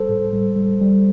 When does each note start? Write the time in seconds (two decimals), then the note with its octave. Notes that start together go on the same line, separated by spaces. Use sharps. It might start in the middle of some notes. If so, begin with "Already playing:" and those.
Already playing: G3 A4 C5
0.09 A2
0.33 G3
0.56 G3
0.81 G3